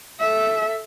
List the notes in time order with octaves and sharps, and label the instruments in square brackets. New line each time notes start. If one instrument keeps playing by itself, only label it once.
[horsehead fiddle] A4 E5